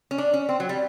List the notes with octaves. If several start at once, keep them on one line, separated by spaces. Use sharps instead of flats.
C#4
D4
C#4
C4
F#3
G3